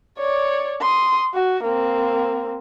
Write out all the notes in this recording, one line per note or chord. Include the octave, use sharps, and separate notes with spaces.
C#5 D5
C6 D#6
F#4
A#3 C4